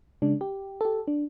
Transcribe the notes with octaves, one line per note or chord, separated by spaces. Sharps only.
C#3 G#3 D4
G4
G4 A4
D4